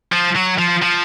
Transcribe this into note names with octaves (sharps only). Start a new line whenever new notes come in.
F3
F#3
F3
F3